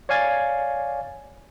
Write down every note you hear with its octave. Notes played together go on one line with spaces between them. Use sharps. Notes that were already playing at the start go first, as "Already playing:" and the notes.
C#5 D5 F5 G#5 G#6 A6